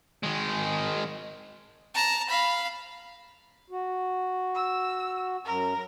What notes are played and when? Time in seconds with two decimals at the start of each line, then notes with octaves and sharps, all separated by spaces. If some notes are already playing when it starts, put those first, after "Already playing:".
0.24 D#3 G#3
1.94 A5 A#5
2.29 F5 B5
3.70 F#4
4.55 E6
5.45 F#2 A#4